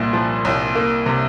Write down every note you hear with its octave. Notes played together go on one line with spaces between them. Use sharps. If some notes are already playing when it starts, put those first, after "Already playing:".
Already playing: C2 A#2
F3
C2
A#3
C3